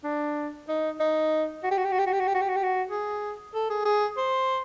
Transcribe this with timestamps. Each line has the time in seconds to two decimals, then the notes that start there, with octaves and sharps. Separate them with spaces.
0.04 D4
0.68 D#4
1.00 D#4
1.63 F#4
1.71 G4
1.77 F#4
1.85 G4
1.92 F#4
1.99 G4
2.07 F#4
2.13 G4
2.20 F#4
2.27 G4
2.34 F#4
2.41 G4
2.48 F#4
2.56 G4
2.63 F#4
2.90 G#4
3.54 A4
3.70 G#4
3.85 G#4
4.17 C5